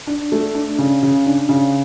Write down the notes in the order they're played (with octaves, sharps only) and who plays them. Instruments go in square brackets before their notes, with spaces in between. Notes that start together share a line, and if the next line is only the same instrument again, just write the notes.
[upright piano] D4
A3
D4
C#3
C#3
D4
C#3